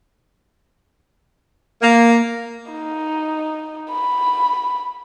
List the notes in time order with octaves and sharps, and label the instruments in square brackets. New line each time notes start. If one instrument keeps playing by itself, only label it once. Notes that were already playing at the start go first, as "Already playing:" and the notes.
[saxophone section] A#3
[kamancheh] D#4
B5